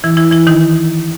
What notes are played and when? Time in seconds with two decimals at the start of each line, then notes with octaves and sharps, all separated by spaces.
0.04 E3 E4
0.17 E3 E4
0.31 E3 E4
0.47 D#3 D#4